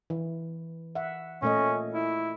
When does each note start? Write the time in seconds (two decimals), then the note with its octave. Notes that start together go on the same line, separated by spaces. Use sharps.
0.10 E3
0.95 E5 F#5
1.42 A#2 A3 C#4 D#5
1.94 E4